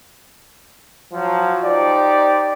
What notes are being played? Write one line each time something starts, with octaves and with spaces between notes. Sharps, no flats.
F3 F#3
D#4 G4 C5 D5